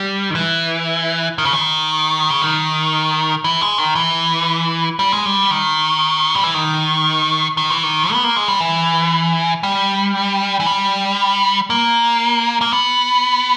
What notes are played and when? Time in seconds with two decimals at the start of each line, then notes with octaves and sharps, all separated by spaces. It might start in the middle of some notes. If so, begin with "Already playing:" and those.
Already playing: G3
0.31 D#3
0.35 E3
1.38 D#3
1.45 C#3
1.53 D#3
2.30 C#3
2.42 D#3
3.44 E3
3.61 G#3
3.78 D#3
3.95 E3
4.99 G3
5.12 G#3
5.26 G3
5.51 D#3
6.35 G3
6.43 E3
6.54 D#3
7.57 D#3
7.70 E3
7.83 D#3
8.12 B3
8.24 A#3
8.36 G#3
8.48 G3
8.60 E3
9.63 G3
10.60 E3
10.66 G3
11.70 A#3
12.61 A#3
12.73 B3